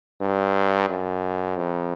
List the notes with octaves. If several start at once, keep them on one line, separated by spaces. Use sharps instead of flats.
G2
F#2
F2